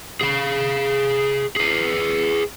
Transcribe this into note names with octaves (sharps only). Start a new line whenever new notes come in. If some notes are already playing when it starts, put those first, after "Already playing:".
G#4 F5
G#4 B4